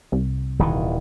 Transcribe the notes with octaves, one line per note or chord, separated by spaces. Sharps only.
C2
D#1 D#3 E3